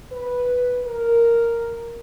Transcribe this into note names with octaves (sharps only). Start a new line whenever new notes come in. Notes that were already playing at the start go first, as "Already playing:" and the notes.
B4
A#4